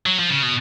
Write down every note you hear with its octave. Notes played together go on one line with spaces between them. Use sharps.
F#3
F3
C#3
B2